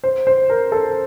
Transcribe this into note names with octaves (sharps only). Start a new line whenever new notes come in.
C5
C5
A#4
A4